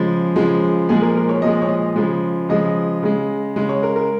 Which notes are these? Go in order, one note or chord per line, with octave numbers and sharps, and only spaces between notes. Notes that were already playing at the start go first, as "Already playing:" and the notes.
Already playing: C#3 F3 G#3
C#3 F3 G#3
A#2 F3 G#3 G#4
A#4
A#4
C#5
A#2 F3 G#3 D#5
C#5
D#5
C#3 F3 G#3
C#3 F3 G#3 D#5
C#3 G#3
C#3 G#3
C#5
A#4
A#4